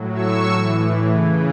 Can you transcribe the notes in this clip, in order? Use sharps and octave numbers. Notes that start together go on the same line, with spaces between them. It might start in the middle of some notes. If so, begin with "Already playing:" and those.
Already playing: A2 F#3
C#6 E6
A2 E3
C#3 E3